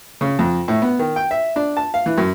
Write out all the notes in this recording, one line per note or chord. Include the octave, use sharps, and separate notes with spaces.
C#3
F2
A2
B3
D#3
G5
E5
D4
A5
F5
E3
F#2